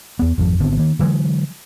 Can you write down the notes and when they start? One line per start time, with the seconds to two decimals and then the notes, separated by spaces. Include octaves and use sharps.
0.19 E2 B3
0.38 G#1 F2 F3
0.60 G#1 D3 B3 C4
0.77 D#3 A#3
0.99 D3 E3 F#3 G#3